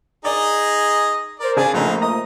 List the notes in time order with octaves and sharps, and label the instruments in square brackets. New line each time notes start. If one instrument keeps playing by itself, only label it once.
[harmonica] D#4 G#4 D#5 [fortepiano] D5
[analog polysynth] A#4 C5 [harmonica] D5
[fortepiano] C#3 G#4 A5 [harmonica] D4 G#5 [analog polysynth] D5
[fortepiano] A#1 C#3 [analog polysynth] F3 A3 A#3 [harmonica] D#4
[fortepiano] D#5 A#5 [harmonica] D#6